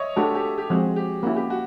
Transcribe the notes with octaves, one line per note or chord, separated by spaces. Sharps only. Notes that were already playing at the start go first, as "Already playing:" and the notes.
Already playing: C#5 D#5 E5
A3 D4 F#4 G4 A4
G4 A4
G4
F3 G#3 C4 F#4 G#4
G4
A#3 C#4 E4 F#4
G4
F#4